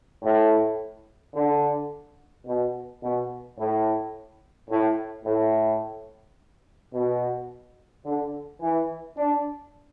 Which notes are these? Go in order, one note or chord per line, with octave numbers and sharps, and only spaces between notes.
A2
D3
B2
B2
A2
A2
A2
B2
D3
E3
D4